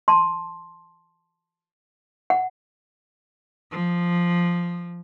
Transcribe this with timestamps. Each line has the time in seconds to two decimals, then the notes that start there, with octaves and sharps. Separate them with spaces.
0.08 A5 C6
2.30 F#5
3.71 F3